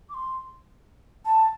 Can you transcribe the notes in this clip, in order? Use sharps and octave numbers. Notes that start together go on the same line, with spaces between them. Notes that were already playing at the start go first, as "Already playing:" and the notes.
D6
C6
A5